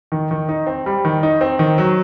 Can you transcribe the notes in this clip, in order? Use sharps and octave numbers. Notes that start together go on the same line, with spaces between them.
D#3
D#3
D#4
C4
G3
D#3
D#4
C4
D#3
F#3